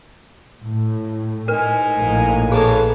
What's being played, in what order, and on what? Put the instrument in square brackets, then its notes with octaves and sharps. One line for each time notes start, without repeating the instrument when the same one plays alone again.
[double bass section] A2
[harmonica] D#4 G#5 [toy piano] A#4 B4
[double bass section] A#1 A2 A#3
[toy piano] G#4 A4 [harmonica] B4 C#5 A5